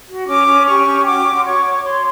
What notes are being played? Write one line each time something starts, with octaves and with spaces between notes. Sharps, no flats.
F#4
C#4 D6
C#4
G4 C#6
C#4
F#4 D6
F#4
C6
C#5 C#6
C#5
C#5 C6